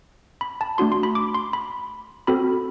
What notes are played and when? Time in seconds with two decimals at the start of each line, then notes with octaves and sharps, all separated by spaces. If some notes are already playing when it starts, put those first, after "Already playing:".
0.41 B5
0.61 A5
0.78 A3 D4 F#4 C6
0.92 C6
1.03 B5
1.15 D6
1.34 C6
1.53 B5
2.27 C4 F#4 A4 B5